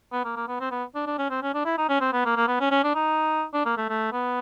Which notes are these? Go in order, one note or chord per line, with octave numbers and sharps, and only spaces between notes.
B3
A#3
A#3
B3
C4
B3
D4
D4
C#4
C4
C#4
D4
E4
D#4
C#4
C4
B3
A#3
A#3
B3
C#4
C#4
D4
D#4
D4
A#3
A3
A3
B3